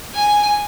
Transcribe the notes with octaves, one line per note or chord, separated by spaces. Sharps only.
G#5